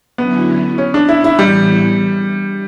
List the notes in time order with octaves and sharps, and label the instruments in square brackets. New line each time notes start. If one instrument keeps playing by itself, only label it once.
[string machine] D3 F#3 C#4 E4 [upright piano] B3
[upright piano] C#4
D4
E4
E4
[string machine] A2 E3 B3 E4 [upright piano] G3